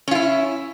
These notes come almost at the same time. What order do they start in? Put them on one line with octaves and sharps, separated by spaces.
C#4 F4 E4